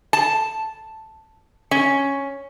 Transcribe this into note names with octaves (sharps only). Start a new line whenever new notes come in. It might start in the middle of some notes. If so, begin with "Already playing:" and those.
A5
C#4